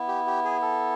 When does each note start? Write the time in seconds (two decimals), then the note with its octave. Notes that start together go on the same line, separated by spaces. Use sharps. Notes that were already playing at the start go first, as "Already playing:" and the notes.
Already playing: B3 E4
0.08 G4
0.27 G4
0.45 G#4
0.62 A4